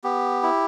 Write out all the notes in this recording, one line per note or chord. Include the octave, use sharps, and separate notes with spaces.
B3 G4
E4